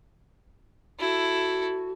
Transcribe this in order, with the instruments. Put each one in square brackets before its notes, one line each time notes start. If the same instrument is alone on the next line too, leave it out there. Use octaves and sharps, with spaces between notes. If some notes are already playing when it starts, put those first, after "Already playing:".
[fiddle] E4 A4 [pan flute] F#4